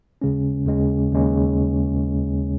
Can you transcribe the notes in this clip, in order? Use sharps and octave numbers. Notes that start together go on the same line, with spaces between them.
D#2 C#3 G#3 C#4
D#2 C#3 G#3 C#4
D#2 C#3 G#3 C#4